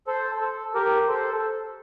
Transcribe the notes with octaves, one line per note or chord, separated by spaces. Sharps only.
A4 C5
A4
G4 A#4
A4 C5